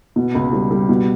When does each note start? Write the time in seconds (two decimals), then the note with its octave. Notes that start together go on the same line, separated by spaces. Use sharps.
0.16 B2
0.35 C#2
0.53 G3
0.71 G3
0.89 B2